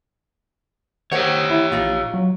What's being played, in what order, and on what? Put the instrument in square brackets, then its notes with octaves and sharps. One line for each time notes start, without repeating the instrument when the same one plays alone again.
[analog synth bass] D#3 [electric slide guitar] G4 C#5 [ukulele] C5 F#5
[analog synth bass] E4
[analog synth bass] A#1 [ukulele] D#4 F4
[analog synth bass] F#3